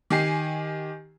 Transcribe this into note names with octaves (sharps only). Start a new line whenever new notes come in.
D#3 G4 G#5 C7